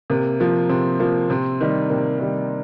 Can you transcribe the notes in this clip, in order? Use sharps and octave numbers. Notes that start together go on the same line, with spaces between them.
C3 A#3
F3 A#3
C3 C4
F3 A#3
C3 C4
D#3 G3
C3 A#3
D#3 G3